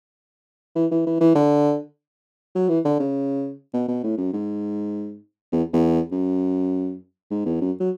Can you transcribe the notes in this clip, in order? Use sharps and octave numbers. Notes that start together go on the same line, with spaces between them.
E3
E3
E3
E3
D3
F#3
E3
D3
C#3
B2
B2
A2
F#2
G#2
E2
E2
F#2
G#2
E2
F#2
F#3